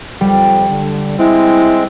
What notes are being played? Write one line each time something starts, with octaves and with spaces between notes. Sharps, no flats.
F2 G3
D3
G#3 C4 E4